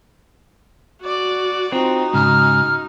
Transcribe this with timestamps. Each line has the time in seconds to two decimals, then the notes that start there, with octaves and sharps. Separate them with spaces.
1.02 F#4 D5
1.72 C4 D#4 F4 F#4
2.14 G#2 C#3 F6